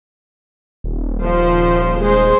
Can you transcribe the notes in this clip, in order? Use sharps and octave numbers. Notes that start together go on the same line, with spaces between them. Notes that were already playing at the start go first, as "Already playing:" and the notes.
D#1
F3 C5
G#3 C5